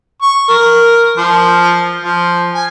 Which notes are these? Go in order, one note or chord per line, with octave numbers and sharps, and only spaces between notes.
C#6
A#4
F3
F3
G#5